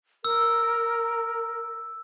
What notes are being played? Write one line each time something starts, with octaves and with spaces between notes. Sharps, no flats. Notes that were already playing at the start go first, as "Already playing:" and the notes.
A#4 E6